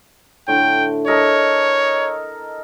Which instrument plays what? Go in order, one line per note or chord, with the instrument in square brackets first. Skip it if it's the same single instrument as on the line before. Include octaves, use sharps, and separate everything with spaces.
[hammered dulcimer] A2 D3 [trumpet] G5
[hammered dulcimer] A4 A#4 D#5 [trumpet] C#5